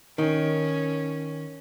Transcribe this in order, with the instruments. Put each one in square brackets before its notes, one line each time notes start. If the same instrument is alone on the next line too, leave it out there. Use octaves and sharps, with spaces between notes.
[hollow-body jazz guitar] D#3 [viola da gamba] C#4